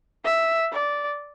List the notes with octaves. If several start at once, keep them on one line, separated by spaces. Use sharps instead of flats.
E5
D5